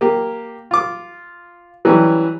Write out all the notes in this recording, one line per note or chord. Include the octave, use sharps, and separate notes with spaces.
A#3 G4
F4 D6
E3 F#3 G3 C#4